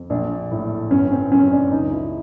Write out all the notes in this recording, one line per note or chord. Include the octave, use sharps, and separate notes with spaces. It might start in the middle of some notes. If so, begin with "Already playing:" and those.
Already playing: F2
A#1 D4
A2
G1 C#4
C4
F#2 C#4
D4
C#2 D#4
E4